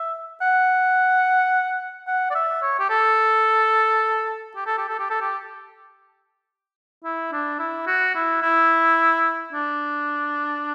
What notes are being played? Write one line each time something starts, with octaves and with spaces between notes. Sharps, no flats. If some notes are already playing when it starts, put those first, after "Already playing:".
Already playing: E5
F#5
F#5
D5
E5
C#5
G4
A4
G4
A4
G4
A4
G4
A4
G4
E4
D4
E4
F#4
E4
E4
D4